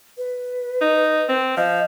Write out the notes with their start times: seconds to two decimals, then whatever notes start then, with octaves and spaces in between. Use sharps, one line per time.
0.18 B4
0.81 D#4
1.28 C4
1.57 F3 D#5